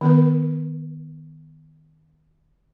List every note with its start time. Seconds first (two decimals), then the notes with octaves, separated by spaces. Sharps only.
0.01 D#3 B3 A#4 B4